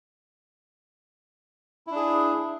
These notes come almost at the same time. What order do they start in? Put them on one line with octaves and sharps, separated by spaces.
E4 D4 G#4